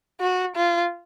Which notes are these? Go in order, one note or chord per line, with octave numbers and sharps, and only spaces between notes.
F#4
F4